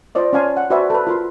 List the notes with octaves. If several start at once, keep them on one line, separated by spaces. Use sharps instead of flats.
F4 C5 D5 D#5
C#4 D5 F5 G#5 A5 C6
F#5
F#4 B4 C5 D5 E5 G#5
A4 B4
F4 A#4 C6